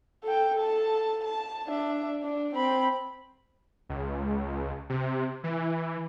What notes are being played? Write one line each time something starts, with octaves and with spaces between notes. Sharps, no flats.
A4 G5
A4 A5
A5
D4 E5
D4
C4 B5
C#2
C3
E3